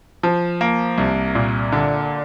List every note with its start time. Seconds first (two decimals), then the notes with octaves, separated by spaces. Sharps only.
0.23 F3
0.61 A#3
0.98 C2
1.35 A#2
1.72 D3